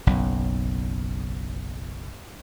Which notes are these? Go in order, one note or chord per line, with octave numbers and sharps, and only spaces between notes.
F#1 B1 C#3